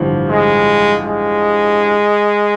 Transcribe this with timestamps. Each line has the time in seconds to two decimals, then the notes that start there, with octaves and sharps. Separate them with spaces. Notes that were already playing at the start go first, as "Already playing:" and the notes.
Already playing: A1 G2 D3 F3
0.29 G#3
1.02 G#3